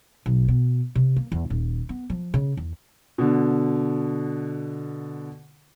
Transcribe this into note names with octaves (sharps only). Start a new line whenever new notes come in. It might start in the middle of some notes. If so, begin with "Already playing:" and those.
B1
B2
C3
A#3
E2
D#1
B3
F3
C#3
E2
B2 D3